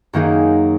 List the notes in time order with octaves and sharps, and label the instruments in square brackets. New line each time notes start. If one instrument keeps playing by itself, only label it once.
[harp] F#2 D#3 A#3 D#4 G#4